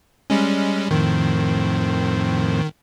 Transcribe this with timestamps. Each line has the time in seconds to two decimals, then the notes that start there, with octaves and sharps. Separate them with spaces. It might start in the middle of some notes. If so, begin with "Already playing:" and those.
0.30 G3 G#3 C#4
0.91 F2 A2 D#3 C4